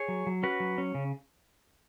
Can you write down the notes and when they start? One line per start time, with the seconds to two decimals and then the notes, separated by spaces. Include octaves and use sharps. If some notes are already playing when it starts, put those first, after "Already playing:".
Already playing: G#4 C#5
0.08 F#3
0.27 F#3
0.43 C#4 F#4 B4
0.60 F#3
0.78 C#4
0.95 C#3